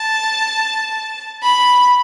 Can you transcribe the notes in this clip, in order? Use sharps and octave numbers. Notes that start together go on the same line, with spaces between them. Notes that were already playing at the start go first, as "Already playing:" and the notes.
Already playing: A5
B5